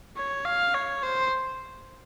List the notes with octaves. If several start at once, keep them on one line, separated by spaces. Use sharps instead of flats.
C#5
F5
C#5
C5